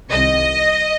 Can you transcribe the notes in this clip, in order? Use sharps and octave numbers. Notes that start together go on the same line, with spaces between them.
C2 C3 D#3 D#5